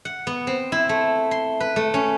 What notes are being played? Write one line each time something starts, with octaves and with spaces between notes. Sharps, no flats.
F#5
B3
C4
E4
A3
C6
B4
A3
C#4